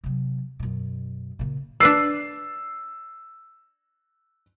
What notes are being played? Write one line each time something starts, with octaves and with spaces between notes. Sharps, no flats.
C3 F#3
F#2 B2
A#2 C#3
D4 B4 D5 E6 C7